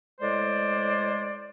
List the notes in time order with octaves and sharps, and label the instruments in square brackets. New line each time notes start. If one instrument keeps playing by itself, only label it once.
[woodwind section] A2 G#3 C5 D5